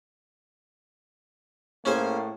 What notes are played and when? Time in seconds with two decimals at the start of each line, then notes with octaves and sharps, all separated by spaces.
1.85 A2 A#3 C#4 G#4 C5